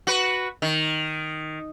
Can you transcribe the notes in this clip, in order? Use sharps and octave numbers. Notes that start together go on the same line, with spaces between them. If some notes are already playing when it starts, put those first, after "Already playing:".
F#4 B4
D#3